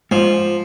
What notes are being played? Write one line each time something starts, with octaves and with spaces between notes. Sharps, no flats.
G#2 F3